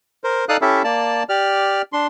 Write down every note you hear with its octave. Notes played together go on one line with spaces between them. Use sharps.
A#4 C5
D#4 A4 D5 F5 D#6 F#6
C#4 E4 G4 A4 E5
A#3 D5 A5
G4 D5 F6
D4 C6